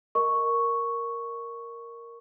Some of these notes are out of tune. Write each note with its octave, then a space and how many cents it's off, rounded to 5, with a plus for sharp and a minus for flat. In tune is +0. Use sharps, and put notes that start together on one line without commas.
A#4 +0 D#5 +0 C#6 +0